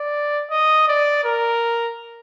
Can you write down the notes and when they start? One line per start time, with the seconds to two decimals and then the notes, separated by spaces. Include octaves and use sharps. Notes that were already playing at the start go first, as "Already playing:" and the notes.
Already playing: D5
0.51 D#5
0.88 D5
1.24 A#4